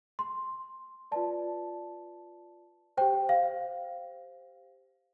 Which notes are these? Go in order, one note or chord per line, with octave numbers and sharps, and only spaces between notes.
C6
F4 B4 D5 A5
G4 C5 G5
F5